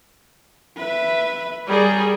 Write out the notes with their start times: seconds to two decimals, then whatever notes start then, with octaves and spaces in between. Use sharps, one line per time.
0.77 B4 E5
1.67 G3 G#4 A#4 C#5